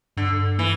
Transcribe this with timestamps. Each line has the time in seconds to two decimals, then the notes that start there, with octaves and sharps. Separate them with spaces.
0.17 G2 D3
0.58 E3 A#3